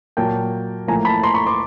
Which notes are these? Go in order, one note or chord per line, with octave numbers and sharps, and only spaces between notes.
A#2 F#3 A#3 G5 A5
A2 F3 A#3 G#5 A#5
A5 B5
A#5 C6
B5 C#6
C6 D6